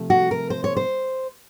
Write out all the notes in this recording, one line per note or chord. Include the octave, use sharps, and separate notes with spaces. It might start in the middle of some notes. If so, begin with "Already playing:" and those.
Already playing: C3 F3 A3
F#4
A#4
C5
C#5
C5